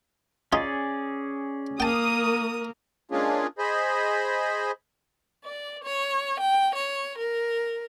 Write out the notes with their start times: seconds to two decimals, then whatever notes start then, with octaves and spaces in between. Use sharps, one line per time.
0.53 C#4 D#4 F4 G#4 D5
1.80 A#3 A#4 G5 A5 D#6
3.11 G#3 A#3 C#4 D4 F4 G#4
3.58 G#4 C5 D#5 B5
5.44 D5
5.83 C#5
6.39 G5
6.75 C#5
7.18 A#4